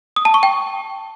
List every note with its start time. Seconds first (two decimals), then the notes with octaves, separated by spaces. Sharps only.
0.16 D#6
0.25 A5
0.34 C#6
0.43 G5